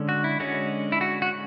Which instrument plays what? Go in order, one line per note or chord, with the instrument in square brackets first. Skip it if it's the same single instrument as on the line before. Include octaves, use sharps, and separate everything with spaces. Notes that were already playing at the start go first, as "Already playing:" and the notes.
Already playing: [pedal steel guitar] D3 G#3 C#4
F#4
E4
D3 G#3 C#4 F#4
E4
F#4
F#4